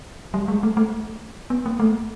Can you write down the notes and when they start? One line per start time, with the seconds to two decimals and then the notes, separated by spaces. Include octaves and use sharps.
0.34 G3
0.48 G#3
0.63 A3
0.77 A3
1.50 B3
1.66 A#3
1.80 A3